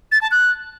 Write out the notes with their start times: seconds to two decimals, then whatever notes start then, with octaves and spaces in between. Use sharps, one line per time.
0.12 A6
0.22 A5
0.31 F#6